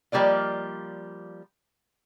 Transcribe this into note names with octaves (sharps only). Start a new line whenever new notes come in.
F3 G3 A#3 D5 D#5